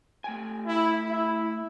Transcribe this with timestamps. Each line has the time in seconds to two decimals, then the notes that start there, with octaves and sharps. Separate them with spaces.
0.24 A3 G5 G#5
0.67 E4
1.10 E4